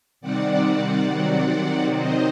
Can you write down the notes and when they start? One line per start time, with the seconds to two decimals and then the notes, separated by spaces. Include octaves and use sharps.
0.21 C3 D#3 G3 C4 D5 F#5
1.09 C3 D#3 F#3 C4
1.97 D#3 F#3 C4 C5 D#5